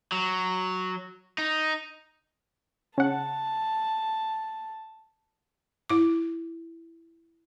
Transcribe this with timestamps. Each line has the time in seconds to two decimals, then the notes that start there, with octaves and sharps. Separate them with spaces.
0.12 F#3
1.38 D#4
2.98 C#3 F#5 A5
5.89 E4 D6